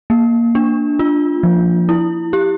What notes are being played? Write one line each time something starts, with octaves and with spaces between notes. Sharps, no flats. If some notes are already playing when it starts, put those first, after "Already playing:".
A#3
D4
F4
F3
E4
G4